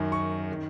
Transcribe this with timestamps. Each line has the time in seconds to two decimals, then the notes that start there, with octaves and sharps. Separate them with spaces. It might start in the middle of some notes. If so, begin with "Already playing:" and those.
Already playing: F#2 D#3
0.12 C#6
0.52 D#3